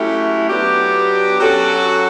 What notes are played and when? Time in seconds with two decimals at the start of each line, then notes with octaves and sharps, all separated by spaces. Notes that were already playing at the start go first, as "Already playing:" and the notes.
Already playing: F#3 A3 C#4 E4 G4
0.48 F#3 B3 D4 G4
1.39 F#3 C#4 F#4 A4